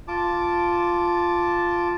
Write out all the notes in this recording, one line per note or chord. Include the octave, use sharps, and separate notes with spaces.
F4 A5 D6